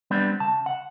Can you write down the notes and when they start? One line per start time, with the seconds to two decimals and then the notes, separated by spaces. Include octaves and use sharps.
0.11 G3 B3 C4 D4
0.40 C#3 A5
0.66 F#5